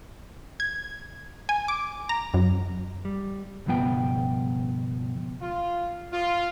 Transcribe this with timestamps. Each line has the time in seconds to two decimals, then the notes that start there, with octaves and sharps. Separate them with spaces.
0.60 G#6
1.49 G#5
1.68 D6
2.09 A#5
2.34 F#2
3.05 G3
3.66 C#2 G2 B2 F3 B3 G5
5.42 F4
6.13 F4